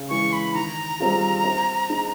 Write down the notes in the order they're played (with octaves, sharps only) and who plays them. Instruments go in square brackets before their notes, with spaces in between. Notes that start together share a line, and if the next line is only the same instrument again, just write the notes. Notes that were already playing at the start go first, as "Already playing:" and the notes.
Already playing: [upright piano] C#3
[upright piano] E3 G#3 [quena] C#6
[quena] B5
[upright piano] D#3 [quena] A#5
[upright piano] G3 C4 F4 G#4
C4
D#4 G#4